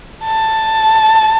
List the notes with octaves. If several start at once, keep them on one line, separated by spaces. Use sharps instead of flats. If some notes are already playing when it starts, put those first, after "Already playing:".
A5